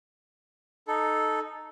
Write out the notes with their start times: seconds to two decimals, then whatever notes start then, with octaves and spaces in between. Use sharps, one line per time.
0.88 D#4 A4